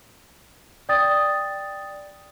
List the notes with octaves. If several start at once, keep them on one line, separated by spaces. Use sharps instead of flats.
D5 G5 D#6 A6